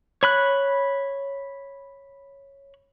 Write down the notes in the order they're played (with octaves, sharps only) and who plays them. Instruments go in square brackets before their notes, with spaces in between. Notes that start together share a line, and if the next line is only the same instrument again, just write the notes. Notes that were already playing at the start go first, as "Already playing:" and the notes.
[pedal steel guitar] C#5 B5 F#6